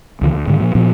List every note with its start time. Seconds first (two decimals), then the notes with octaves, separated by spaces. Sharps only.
0.21 C#2 D3 E3
0.34 D2
0.47 G#2 D3 D#3
0.60 A#2 F3
0.75 A#2 F3 B3